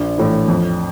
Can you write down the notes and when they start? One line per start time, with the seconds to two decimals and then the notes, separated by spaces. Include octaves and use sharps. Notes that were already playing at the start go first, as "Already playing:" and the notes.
Already playing: A#1
0.18 A2 E3
0.48 F2